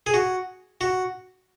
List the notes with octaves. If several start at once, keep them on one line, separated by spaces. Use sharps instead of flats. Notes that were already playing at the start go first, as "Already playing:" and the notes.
G#4
F#4
F#4